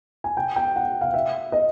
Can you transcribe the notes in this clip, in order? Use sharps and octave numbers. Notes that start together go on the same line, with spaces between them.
G#5
G5
G5
F#5
F5
E5
D#5